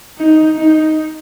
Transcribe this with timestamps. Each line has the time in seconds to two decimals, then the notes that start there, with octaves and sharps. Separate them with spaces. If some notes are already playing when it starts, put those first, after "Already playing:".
0.17 D#4
0.56 D#4